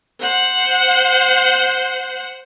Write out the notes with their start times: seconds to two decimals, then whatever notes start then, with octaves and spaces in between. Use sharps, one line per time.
0.20 C5 F#5